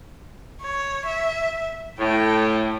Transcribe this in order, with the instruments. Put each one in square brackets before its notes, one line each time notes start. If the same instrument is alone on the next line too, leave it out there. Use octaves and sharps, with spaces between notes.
[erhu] C#5
E5
[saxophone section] A2 [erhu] G5